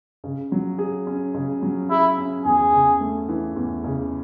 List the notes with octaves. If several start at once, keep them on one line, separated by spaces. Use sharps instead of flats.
C#3
F#3
G#4
C#4
C#3
F#3
E4 G#4
C#4
E2 G#4
C#3
A3
E3
E2
C#3